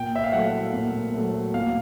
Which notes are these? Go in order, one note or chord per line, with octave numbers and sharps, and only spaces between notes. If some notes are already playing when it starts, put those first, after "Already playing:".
Already playing: A#2 G5
E5
F5
F#3 A3 F#5
A#2
F#3 A3
A#2 F5